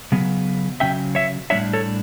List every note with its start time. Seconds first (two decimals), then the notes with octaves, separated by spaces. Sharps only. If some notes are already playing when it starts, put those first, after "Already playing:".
0.12 C#3 F#3 B3
0.80 C#3 F#3 C#4 E5 G5
1.15 C#5 E5
1.50 A2 G3 B3 D4 C#5 E5
1.73 A4 C#5